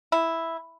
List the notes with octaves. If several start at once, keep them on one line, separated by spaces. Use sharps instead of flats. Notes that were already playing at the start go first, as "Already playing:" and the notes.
E4